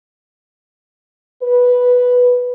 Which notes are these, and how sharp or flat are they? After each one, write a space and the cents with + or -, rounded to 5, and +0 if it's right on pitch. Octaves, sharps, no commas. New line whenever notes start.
B4 -5